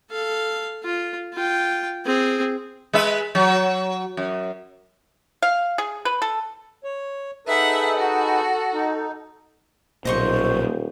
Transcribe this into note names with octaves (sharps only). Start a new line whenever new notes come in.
A4 F5
F4
F4 G5
C4 G#4
G#3 B4 E5
F#3
F#2
F5
G#4
B4
A4
C#5
D#4 G#4 A4 B4 E5 F#5
F#4
D#4
D#1 B1 A#2 C5 D#5 C6 C#6